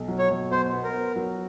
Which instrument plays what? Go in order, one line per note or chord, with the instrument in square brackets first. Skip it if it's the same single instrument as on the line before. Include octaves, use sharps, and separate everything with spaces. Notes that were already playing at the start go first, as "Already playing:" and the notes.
Already playing: [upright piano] B1
F#3
[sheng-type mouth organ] C#5
[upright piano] B1
[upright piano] B2 [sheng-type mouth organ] C5
[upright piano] B3
[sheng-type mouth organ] A#4
[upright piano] B3
F#3